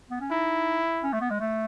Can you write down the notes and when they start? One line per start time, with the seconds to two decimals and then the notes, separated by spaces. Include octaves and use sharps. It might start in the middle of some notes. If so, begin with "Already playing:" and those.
0.10 B3
0.21 C#4
0.31 D#4 E4
1.03 C#4
1.13 A3
1.21 B3
1.30 G#3
1.40 A3